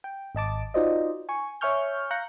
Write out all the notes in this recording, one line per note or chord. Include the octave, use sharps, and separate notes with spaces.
G5
G#1 D#5 A5 D6
D#4 F4 F#4 C5 D5 D#5
G#5 C#6
C#5 E5 G#5 C#6 F6 G6
F5 A#5 F#6 G6 A#6 C#7